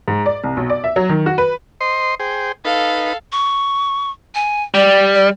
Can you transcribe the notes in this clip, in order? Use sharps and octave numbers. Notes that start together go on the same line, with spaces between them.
G#2
D5
C2
B1
D5
E5
F#3
D#3
F#4
B4
C5 D#5 C6
G#4 C5 G5
D#4 A4 B4 F5
C#6
G#5
G3 D5
D5